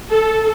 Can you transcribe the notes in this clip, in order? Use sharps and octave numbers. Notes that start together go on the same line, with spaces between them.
A4